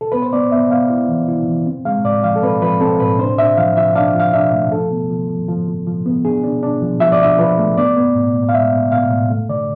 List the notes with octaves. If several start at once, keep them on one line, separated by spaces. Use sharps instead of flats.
A4
B3 B4
C5
B3 D5
B3 E5
B3 F5
E4
E3
E4
E3
C4
G#3 F5
A2 D5
F3 F5
A4
C4 B4
F3 B4
C4 A4
A2 B4
D4 C5
D4 E5
F3 F5
F3 E5
D4 F5
F3 F5
D4 E5
A3
F3 A4
B3
F3
F3
F3
F3
F3
B3
D4 G#4
D4
D4
F3
F3 E5
D5
D4 E5
F3 B4
A3
B3 D5
B3
A2
A2
F5
G#3 E5
B3
B3 F5
A2
A3
D3 D5